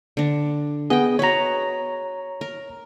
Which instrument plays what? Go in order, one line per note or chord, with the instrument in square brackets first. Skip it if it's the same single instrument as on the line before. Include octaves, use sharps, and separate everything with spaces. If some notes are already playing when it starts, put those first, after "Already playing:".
[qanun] D3 D4
[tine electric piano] B3 G#4 [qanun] D#5 G5
[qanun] F#4 B4 [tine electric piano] C#5 A#5
[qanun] A#4